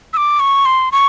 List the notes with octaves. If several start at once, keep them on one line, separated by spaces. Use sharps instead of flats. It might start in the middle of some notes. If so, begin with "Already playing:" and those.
E6
D6
C#6
C6
C#6